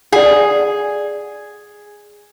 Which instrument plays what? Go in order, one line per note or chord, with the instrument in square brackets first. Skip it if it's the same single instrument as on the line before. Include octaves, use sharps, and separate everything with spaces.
[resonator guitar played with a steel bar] G#4 [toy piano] D5 F#5